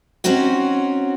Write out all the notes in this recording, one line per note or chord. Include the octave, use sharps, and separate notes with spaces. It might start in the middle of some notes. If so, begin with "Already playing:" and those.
C4 C#4 D#4 F#4 C#5